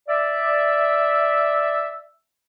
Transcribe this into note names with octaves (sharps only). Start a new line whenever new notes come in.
D5 E5